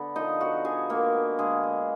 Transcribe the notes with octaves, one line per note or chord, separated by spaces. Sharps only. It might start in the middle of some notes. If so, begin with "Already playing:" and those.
Already playing: D3 B3
F3 D#4 D#5
B3 F#4 F#5
D3 G#4 G#5
G#3 A#3 A#4
B3
D3 G#3 G#4
G#3